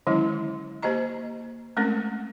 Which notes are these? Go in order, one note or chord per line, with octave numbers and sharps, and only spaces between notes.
D3 D#3 F#3 G#3 C#4 E4
A#3 G4 C5 D#5 A#5
G#3 A3 C4 C#4 A#4